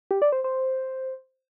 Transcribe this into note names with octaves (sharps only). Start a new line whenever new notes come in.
G4
D5
C5
C5